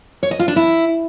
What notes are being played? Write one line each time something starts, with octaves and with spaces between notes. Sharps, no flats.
C#5
D#5
F4
D4
E4